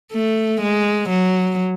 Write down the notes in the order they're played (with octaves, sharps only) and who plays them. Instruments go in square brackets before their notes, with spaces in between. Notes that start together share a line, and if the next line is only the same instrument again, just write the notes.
[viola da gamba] A3
G#3
F#3